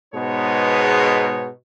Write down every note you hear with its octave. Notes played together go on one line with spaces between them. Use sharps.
G#2 B2 G#3 B3 D#4 C#5